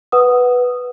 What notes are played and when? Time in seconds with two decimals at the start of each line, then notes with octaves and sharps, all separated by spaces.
0.12 B4 F#5 D#6